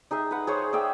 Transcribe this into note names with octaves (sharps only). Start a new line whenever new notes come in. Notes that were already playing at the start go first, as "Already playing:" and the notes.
D#4 G#4 D#5 E5
B4 F#5
G#4 C5 C#5
G#4 D5 E5 G5